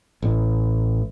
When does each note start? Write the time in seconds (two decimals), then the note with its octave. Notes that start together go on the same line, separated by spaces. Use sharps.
0.22 A1